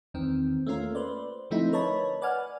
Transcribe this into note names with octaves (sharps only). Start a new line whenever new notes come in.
E2 D#3 C4
A3 A#3 C#4 F4 A#4
B4 C5 D5
D3 F3 A3 C4 D#4 E4
A#4 B4 C#5 D#5 A5 B5
B4 D5 F#5 G#5 F6